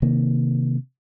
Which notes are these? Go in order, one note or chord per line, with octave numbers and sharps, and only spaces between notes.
C3 D#3 A#3